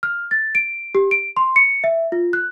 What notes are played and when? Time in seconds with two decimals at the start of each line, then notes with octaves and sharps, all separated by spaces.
0.03 F6
0.31 A6
0.55 D7
0.95 G4
1.11 D7
1.37 C6
1.56 C#7
1.84 E5
2.12 F4
2.33 F#6